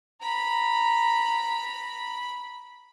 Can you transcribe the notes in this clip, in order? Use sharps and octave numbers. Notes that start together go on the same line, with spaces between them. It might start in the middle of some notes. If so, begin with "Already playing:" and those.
A#5 B5